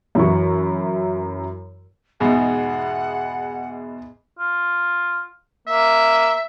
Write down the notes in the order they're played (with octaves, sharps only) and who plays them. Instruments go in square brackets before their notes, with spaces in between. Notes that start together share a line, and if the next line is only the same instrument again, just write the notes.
[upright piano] F#2 E3 E4 F#4 C#6
[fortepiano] E2 G#2 B2 [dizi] F#5
[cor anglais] F4
[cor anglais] A#3 [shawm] E5